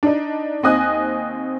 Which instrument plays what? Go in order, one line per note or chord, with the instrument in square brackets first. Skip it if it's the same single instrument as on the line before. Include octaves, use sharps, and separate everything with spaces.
[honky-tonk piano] D4 D#4
D#2 C4 D#5 G#5 D#6 F#6